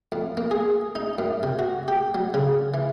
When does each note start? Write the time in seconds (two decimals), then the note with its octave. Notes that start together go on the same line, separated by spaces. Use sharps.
0.12 F2
0.37 A#3
0.51 G#4
0.95 D#4
1.18 F#2
1.43 C3
1.59 F#4
1.88 G4
2.15 F#3
2.34 C#3
2.74 E3